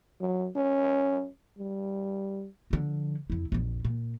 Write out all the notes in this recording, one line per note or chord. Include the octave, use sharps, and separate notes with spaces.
F#3
C#4
G3
D3 F3
F2 E4
A#1 F2
A#2